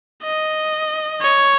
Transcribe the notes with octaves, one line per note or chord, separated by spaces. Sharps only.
D#5
C#5